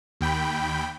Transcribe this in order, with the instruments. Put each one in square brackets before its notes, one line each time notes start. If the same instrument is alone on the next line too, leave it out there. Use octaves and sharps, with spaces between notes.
[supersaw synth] D#2 G5 B5